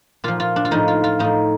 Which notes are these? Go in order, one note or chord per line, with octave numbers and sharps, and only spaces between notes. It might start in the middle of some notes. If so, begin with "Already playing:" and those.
A#2 F3 F4
F4
D4
F4
A2 F3 D#4
F4
F4
A2 F3 D#4